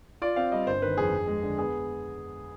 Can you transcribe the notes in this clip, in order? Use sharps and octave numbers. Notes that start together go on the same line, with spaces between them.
F4 D5
C4 F5
G3 D#5
G1 C5
D#3 B4
F2 G#4
F2
G#3
D3
B3 G#4